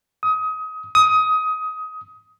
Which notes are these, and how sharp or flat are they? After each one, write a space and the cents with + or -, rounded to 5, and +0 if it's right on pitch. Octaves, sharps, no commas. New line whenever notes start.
D#6 +25
D#6 +20